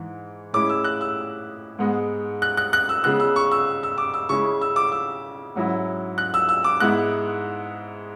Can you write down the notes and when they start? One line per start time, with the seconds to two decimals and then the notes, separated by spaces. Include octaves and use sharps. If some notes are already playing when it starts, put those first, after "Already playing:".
Already playing: G#2 E3
0.53 A2 G#3 C#4 E4 D6
0.69 E6
0.84 F#6
1.01 E6
1.79 G#2 G#3 B3
2.42 F#6
2.57 F#6
2.73 F#6
2.89 E6
3.04 C#3 G#3 B3 F#6
3.20 E6
3.36 C#6
3.51 E6
3.83 E6
3.98 D6
4.14 E6
4.29 C#3 G#3 C#4 E4 C#6
4.61 E6
4.76 D6
4.92 E6
5.56 G#2 F#3 C#4 E4
6.18 F#6
6.34 E6
6.49 E6
6.64 D6
6.80 G#2 G#3 B3 E4 F#6